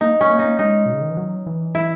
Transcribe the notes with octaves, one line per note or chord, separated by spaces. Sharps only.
A#3 D#4
C#4
A#3
D#4
A#3
G#3 D#4
B2
C#3
D#3
E3
F#3
E3
E4